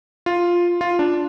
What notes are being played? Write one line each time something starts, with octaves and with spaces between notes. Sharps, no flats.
F4
F4
D4